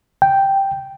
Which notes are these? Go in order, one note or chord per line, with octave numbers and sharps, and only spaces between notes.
G5